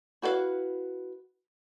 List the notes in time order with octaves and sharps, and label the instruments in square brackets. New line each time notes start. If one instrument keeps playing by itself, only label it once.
[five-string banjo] E4 F#4 B4 C#5 F5